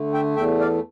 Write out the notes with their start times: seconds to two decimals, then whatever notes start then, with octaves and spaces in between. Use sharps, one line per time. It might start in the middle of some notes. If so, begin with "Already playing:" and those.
Already playing: D3 A3
0.13 E5 G5
0.36 E2 E5 G5
0.60 D5 F5